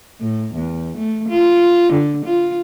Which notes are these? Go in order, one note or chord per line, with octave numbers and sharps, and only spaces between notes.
A2
E2
A3
F4
D3
F4